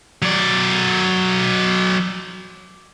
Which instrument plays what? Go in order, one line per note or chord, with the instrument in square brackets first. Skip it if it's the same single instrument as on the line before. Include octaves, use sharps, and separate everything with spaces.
[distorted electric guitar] F#3 D5